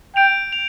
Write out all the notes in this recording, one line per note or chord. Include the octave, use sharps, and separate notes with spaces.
G5 G6 D7 F7
F7